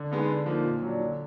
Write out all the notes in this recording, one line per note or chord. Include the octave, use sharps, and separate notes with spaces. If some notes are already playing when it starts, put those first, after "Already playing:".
Already playing: D3
G#3 B3 D#4
D3
F3 A#3 D#4
A#2
F#3
D4
D3